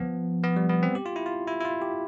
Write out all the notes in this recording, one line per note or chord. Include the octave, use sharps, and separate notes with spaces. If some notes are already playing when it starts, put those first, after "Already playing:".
Already playing: F3 B3
B3
G3
B3
C4
G4
F4
E4
F4
E4
E4
F4
G4